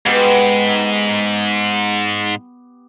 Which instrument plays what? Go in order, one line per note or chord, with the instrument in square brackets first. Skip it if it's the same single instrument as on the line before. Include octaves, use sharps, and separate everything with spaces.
[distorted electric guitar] G#2 [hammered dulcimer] B3 G4 F#5